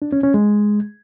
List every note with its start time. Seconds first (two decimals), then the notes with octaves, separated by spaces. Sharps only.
0.02 D4
0.12 C#4
0.23 C#4
0.34 G#3